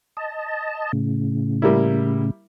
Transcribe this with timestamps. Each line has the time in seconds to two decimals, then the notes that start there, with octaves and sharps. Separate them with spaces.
0.17 D#5 A5
0.93 A2 C#3
1.62 G3 A#3 E4